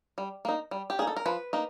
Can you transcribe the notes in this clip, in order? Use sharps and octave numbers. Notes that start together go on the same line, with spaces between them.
G3
A#3 D#4
G3
G4
A#3 D#4 G#4
A4
A#4
F3 B4
A#3 D#4